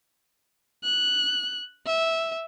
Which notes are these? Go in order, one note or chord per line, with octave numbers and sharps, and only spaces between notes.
F#6
E5